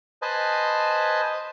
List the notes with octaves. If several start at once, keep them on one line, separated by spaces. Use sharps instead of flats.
B4 C5 D#5 G#5 A5